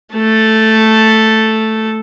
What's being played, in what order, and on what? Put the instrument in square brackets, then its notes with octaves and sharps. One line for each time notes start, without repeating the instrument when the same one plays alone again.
[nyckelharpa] A3 A4